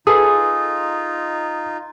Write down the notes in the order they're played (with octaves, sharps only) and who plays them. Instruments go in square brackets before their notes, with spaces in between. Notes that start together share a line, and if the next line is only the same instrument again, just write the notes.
[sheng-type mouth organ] D#4 F4 [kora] G#4 A4 B4 [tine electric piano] D#6